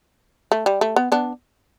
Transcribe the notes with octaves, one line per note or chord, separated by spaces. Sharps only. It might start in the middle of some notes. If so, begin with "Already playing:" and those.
A3
G3
A3
B3
B3 D4